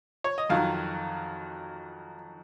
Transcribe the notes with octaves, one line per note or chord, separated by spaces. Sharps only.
C#5
D#5
F2 D#3 F#3 F5